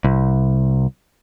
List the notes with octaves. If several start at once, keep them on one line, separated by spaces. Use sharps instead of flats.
C2